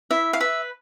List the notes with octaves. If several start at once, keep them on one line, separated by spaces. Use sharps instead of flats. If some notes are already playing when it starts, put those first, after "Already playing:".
E4 E5
F5
B4 E5